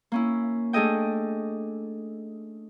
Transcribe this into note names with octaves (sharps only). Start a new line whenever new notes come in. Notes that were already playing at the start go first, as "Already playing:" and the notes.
A#3 C#4 E4
A3 D4 G#4 A4 D#5 G5